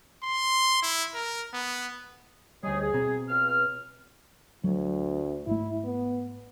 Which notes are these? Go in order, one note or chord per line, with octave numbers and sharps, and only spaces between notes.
C6
E4
A#4
B3
D2 G3 C#4 D#4 G#4
G#4
B2 C4 A#5
C#2 F6
D2 F#3
G#1 A3 E4
B3